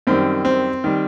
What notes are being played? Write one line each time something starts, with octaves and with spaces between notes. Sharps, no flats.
F#2 D#3 G3 C4
C4
D#3 G3